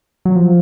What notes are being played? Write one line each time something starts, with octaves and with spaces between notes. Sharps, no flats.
F#3
F3